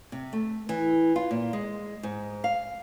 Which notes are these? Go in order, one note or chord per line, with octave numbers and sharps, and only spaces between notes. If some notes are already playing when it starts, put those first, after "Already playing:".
C3
A3
E3
F4
A#2
G#3
G#2
F5